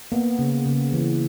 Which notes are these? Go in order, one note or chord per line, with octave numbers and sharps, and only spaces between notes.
A#3 B3
C#3
C#3
E3